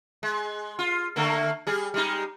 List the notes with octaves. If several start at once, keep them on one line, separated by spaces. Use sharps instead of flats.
G#3
F4
D3 A3 A#3
G3 G#4
G3 G#3 D#4